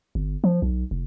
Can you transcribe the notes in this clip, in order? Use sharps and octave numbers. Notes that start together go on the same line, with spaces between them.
G1
F3
B1
F1